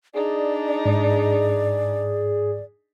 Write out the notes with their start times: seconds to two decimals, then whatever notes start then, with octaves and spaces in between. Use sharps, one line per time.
0.14 D4 D#4 G#4 D5
0.86 G#2